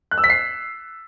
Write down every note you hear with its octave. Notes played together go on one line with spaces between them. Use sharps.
F#6
E6
B6
C7